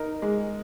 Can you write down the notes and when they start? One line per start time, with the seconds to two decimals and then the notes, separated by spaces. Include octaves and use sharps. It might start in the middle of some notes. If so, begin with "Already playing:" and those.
Already playing: D#4 A#4
0.22 G#3